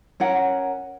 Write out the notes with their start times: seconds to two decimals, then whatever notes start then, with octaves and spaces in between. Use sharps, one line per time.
0.20 C#4 A#4 F#5